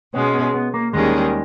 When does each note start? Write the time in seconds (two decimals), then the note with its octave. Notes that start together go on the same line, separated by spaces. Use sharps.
0.14 B2 G#3 B3 C#4
0.34 B3
0.54 B3
0.74 A#3
0.93 D#2 D#3 G3 G#3 C#4 G#4